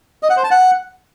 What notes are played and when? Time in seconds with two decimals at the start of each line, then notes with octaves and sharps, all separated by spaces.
0.23 D#5
0.30 F#5
0.37 C5
0.44 A5
0.51 F#5